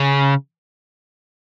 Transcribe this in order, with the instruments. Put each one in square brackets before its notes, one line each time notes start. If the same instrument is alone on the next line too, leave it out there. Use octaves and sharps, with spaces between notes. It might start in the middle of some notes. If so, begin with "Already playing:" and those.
Already playing: [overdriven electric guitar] C#3